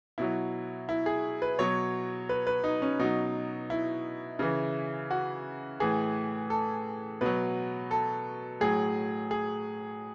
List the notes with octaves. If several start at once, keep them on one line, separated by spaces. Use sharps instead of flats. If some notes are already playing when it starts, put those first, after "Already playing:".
B2 F#3 E4
E4
G#4
B4
B2 F#3 C#5
B4
B4
D#4
C#4
B2 F#3 D#4
E4
C#3 E3
F#4
A2 E3 G#4
A4
B2 F#3 B4
A4
A2 F#3 G#4
G#4